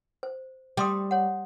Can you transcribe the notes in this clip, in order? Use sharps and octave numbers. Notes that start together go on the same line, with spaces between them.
C5
G3 G5 C6 D#6
C#5 F#5